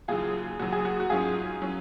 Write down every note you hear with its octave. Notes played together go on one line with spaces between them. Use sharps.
D#2 C#3 F#3 F4 G#4
D#2 C#3 F#3 F#4
G#4
F#4
F#4
G#2 F#3 C#4 F4 G#4
F#3 C#4